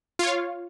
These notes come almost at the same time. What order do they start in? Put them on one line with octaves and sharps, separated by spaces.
F4 C#5 F5